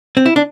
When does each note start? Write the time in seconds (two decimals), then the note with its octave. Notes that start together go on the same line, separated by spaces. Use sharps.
0.17 C4
0.26 E4
0.36 D4